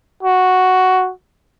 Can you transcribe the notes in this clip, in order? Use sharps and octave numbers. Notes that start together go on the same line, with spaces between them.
F#4